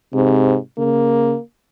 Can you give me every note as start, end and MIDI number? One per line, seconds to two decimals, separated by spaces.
0.14 0.56 44
0.14 0.56 48
0.78 1.34 49
0.78 1.40 58